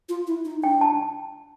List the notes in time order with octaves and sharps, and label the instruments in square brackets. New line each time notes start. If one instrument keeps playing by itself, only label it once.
[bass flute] F4
E4
D#4
[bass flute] D4 [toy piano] G5
[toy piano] A5